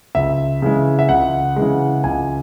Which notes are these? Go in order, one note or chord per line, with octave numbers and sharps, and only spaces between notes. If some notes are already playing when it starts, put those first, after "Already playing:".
C#2 E5
C#3 E3 G#3
E5
C#2 F#5
C#3 E3 G#3
C#2 G#5